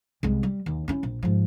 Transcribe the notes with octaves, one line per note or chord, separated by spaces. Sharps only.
C2 G#3
G3
D#2
C#4 E4
A#1
G#2 F3